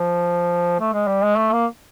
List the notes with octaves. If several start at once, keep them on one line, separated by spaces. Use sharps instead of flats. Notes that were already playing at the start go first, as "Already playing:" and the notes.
Already playing: F3
A3
G#3
G3
G#3
A3
A#3